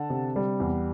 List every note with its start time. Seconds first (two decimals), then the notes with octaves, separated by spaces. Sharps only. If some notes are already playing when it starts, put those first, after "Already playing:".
Already playing: D3 F#5 A5
0.10 C3
0.36 G3
0.60 E2